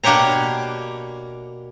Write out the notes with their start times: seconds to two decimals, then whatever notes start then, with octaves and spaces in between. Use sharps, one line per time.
0.03 B2 A#3 D4 G4 C#5 A#5